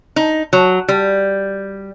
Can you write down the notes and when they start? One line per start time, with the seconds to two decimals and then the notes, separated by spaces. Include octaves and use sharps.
0.16 D#4
0.53 F#3
0.88 G3